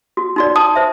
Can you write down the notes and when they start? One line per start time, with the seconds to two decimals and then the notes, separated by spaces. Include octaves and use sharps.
0.17 F#4
0.36 D#4 F#4 D5
0.56 A5 D#6
0.76 C5 E5